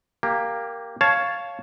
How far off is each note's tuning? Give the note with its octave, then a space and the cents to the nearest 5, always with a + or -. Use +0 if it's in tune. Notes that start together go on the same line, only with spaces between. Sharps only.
A#3 +0 G4 +10
C#5 +5 F5 +0 A5 -10